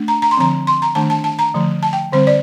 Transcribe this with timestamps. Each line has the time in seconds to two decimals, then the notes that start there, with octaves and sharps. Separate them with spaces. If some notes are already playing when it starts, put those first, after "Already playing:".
Already playing: A3 D4
0.08 A#5
0.22 A#5
0.31 C6
0.37 D3 F3 C4 A#5
0.67 C6
0.82 A#5
0.95 D#3 A3 D4 A5
1.10 A5
1.24 A5
1.39 A#5
1.54 D3 F3 A3
1.83 A5
1.93 G5
2.12 D3 G3 C4 C5
2.27 D5